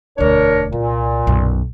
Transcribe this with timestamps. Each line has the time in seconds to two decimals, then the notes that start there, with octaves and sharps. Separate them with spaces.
0.18 E1 D2 D4 A#4 C#5
0.73 C2 A#2
1.27 B1 F#2